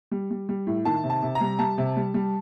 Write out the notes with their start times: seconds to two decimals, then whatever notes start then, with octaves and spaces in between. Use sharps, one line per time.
0.11 G3
0.31 G3
0.49 G3
0.67 A2
0.85 D#3 A5
1.04 C3
1.10 A5
1.22 C3
1.35 A#5
1.41 G3
1.59 G3 A5
1.78 C3
1.97 G3
2.14 G3